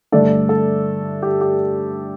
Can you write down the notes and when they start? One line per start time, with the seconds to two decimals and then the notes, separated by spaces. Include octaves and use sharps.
0.12 G2 D3 A3 D4 A4 D5
0.49 A4
1.22 G4
1.41 G4